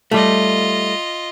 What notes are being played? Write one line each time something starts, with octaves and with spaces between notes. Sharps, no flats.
G3 A3 F4 D#5